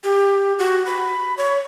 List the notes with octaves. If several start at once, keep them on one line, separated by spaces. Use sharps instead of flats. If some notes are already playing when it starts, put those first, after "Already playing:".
G4
F#4
B5
C#5